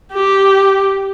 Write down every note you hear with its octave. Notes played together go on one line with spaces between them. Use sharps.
G4